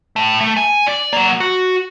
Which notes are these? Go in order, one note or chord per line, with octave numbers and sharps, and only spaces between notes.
A2 A3
A3
G#5
D5
F#3 A#3
F#4